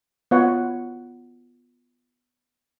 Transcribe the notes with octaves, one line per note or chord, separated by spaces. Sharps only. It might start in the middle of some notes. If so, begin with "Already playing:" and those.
B3 F4 C#5 F#5